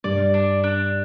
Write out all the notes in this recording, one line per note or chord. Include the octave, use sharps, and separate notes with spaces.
G2 D5
D4
D4